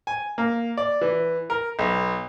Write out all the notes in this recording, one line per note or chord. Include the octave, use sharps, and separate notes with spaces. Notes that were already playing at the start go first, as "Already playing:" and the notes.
G#5
A#3
D5
E3
A#4
B1